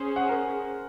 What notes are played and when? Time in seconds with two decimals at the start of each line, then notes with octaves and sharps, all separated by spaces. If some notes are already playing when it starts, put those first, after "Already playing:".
Already playing: C#4 G#4 C5 G#5
0.16 F#5
0.29 A#4